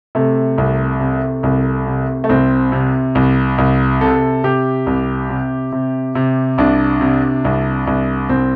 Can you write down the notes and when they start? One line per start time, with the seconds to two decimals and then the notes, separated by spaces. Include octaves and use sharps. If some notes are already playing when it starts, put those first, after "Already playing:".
0.15 C3 A3
0.58 C2
1.00 C3
1.43 C2
1.86 C3
2.24 A3
2.29 C2 C4
2.72 C3
3.15 C2
3.58 C2
4.01 C3 A4
4.44 C3 G4
4.87 C2
5.29 C3
5.72 C3
6.15 C3
6.58 C2 D4
7.01 C3
7.45 C2
7.87 C2
8.29 C2 C4